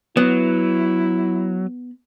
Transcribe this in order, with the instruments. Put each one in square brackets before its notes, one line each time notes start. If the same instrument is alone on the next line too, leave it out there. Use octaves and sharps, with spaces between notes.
[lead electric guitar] F#3 [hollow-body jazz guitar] B3 [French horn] E4